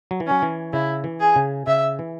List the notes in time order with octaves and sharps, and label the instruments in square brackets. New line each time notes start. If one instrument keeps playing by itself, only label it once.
[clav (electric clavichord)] F#3
E3
[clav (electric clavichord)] F#3 [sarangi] C#4
[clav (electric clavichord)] E3
[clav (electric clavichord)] C#3 [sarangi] E4
[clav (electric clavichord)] E3
[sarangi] G#4
[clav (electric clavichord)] C#3
[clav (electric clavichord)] C#3 [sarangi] E5
[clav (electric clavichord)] E3